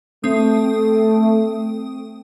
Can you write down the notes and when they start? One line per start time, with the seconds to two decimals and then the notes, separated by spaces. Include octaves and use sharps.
0.24 A3 C4 D#6